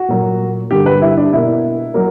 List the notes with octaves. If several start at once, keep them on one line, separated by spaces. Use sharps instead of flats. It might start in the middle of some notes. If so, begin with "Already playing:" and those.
Already playing: F#4
A#2 F#3 A#3
G2 D3 G3 A#3 G4
B4
E4
D4
B2 A#3 E4
F#3 A#3